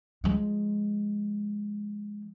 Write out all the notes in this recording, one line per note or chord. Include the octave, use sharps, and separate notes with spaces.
F3 G#3